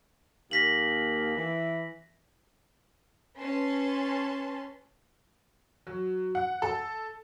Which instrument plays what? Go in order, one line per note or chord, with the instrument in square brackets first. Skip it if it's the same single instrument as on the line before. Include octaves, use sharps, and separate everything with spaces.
[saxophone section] D#2 A#3 [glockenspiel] A#6 B6 F#7
[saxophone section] E3
[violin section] C#4 B4 A5 C6
[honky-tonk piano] F#3
F#5
A4